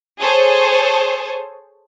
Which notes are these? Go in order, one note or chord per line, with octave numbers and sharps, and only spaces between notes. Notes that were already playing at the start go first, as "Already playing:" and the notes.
G#4 A4 C5 C#5